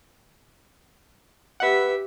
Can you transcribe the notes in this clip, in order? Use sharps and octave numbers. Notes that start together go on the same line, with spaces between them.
G4 B4 E5 F#5